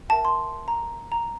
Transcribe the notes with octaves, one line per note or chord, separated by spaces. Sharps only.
A#4 E5 G5 A5
C6
A#5
A#5